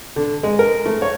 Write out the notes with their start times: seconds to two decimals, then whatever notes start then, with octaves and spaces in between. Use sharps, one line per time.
0.16 D3
0.43 G#3
0.59 A#4
0.86 A3
1.02 C#5